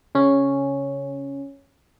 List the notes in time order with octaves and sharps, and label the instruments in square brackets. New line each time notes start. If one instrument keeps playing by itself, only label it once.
[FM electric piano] C#3 C#4